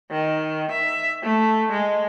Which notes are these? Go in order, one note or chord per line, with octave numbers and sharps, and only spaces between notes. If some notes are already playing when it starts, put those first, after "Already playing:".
D#3
E5
A3
G#3